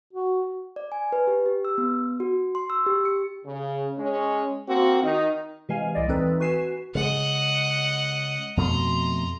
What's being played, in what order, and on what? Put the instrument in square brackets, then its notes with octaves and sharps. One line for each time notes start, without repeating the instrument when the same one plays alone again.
[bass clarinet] F#4
[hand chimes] D5
G#5
B4
G4
G4
E6
B3
F#4
C6
E6
G4
C#7
[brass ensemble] C#3
G#3 C#4
A#3 C4 F#4
D#3 D#4
[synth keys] C3 E3 G#3 F5 G#5
C2 A2 D5 D#5
D#2 E3 C4 D#4 A4 B4
F#4 B4 G#5 C7 E7
[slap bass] C#3 G#3 [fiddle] D#5 F#5
[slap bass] F2 B2 A3 [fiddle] A#5 C6